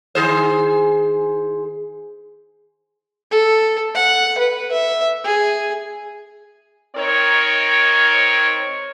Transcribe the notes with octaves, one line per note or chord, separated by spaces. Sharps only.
D#3 G#4 C5
A4
F#5
B4
E5
G#4
D#3 C4 D#4 A#4 C#5